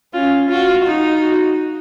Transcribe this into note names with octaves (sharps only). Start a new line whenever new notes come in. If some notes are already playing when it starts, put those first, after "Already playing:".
C#4 F4
F4 F#4
D#4
F#4